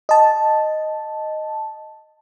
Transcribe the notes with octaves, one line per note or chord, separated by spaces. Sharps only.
D#5 A5